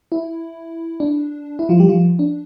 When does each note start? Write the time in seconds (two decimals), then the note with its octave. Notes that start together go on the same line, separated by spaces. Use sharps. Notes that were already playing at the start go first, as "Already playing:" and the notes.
0.12 E4
1.00 D4
1.59 E4
1.69 F3 F4
1.79 G3 G4
1.89 F3 F4
2.19 D4